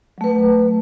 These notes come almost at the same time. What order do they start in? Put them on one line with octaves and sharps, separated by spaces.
F#3 A3 B4